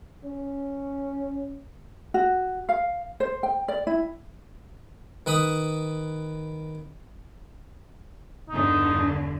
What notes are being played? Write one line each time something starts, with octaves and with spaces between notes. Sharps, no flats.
C#4
F#4
F5
C5
G5
D5
E4
D#3 B4 B5 D#6
E2 G2 D3 D#4